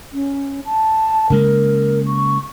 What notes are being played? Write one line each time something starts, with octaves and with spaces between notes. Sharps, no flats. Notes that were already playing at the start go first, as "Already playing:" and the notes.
C#4
A5
C#3 G#3 A#3 A#4
C#6